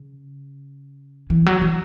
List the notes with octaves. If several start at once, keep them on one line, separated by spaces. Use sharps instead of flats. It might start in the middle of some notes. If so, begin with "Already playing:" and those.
Already playing: C#3
E3
F#3
E3